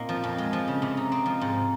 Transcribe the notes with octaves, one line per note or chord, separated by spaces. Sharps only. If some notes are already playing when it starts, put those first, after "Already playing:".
Already playing: A#2 A#3 C4 D#4
F3
F2
G#3
F3
C#3
C3
D#4
C4
F3
G#2